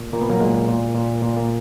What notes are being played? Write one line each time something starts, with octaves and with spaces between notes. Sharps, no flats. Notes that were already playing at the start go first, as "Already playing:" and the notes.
Already playing: A#2
A#2 A#3
B3
F#3 A#3
A#2 G#3
A#2
A#2
A#2
A#3